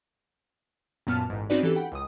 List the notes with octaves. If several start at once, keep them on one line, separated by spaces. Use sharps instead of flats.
F#2 A#2 B3 A5 F6
A1 G#2
C4 C#4 D#4 F#4 B4 D5
E3 G4 A4
F#5 G5 B5
C#2 D#6